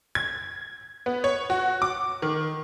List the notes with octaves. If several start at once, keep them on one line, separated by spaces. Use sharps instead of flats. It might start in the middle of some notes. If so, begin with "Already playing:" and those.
G#6
B3
C#5
F#4
D6
D#3